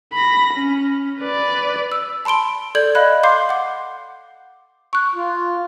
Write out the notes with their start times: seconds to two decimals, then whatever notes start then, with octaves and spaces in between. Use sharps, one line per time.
0.14 B5 A#6
0.54 C#4
1.20 B4 D5
1.92 E6
2.25 A5 B5 C6 D7 G7
2.75 A4 D5 G6 G#6 F#7
2.95 D#5 F5 B5 F#6
3.23 F5 C6 D6 G6 C7
3.49 F#5 D6
4.93 C#6 F#6
5.15 F4